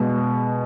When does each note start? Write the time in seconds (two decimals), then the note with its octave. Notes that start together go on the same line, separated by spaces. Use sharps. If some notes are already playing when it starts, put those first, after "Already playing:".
Already playing: B2 G#3